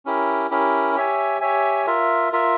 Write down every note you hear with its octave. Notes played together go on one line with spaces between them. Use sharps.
C#4 E4 G4 A#4
C#4 E4 G4 A#4
G4 C#5 E5 G#5
G4 C#5 E5 G#5
F4 A#4 E5
F4 A#4 E5